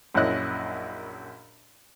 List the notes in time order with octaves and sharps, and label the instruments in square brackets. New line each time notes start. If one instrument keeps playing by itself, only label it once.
[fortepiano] A#1 F#2 C#4 E4 D#5 F#6